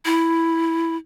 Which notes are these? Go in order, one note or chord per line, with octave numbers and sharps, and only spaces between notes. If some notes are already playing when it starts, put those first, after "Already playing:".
E4